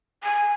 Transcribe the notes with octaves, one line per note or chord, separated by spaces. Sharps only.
G#5